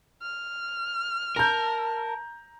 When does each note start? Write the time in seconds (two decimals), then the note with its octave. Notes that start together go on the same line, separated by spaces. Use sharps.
0.22 F6
1.36 A#4 A5 A#5 G6